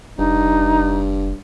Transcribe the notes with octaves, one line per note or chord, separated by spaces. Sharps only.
F1 G2 D#4